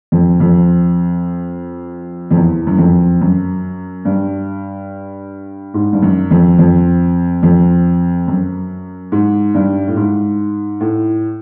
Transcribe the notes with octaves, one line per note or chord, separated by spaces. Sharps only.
F2
F2
F2
E2
F#2
F2
F#2
G2
G#2
G2
F#2
F2
F2
F2
F#2
G#2
G2
A2
G#2
A2